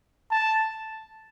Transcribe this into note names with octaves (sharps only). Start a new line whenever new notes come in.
A5